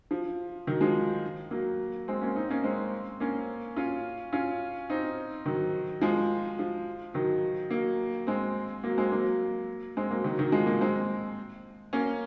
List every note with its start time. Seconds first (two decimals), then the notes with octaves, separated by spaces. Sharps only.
0.11 F3
0.67 D#3 F#3
0.81 F3 G#3
1.51 F#3 A#3
2.08 G#3 C4
2.21 A#3 C#4
2.36 C4 D#4
2.51 A#3 C#4
2.64 G#3 C4
3.20 A#3 C#4
3.76 C#4 F4
4.33 C#4 F4
4.90 C4 D#4
5.46 D#3 F#3
6.01 F3 G#3
6.59 F3
7.14 D#3 F#3
7.71 F#3 A#3
8.27 G#3 C4
8.84 F#3 A#3
8.98 G#3 C4
9.12 F#3 A#3
9.97 G#3 C4
10.10 F#3 A#3
10.24 D#3 F#3
10.38 D#3 F#3
10.52 F3 G#3
10.66 F#3 A#3
10.81 G#3 C4
11.93 A#3 C#4